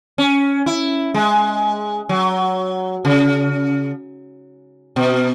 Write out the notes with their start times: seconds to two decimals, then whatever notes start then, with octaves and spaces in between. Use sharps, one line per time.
0.18 C#4
0.66 E4
1.14 G#3
2.09 F#3
3.05 C#3
4.96 B2